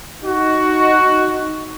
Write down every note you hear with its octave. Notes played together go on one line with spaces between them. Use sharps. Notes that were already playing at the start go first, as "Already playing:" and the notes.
D#4 F#4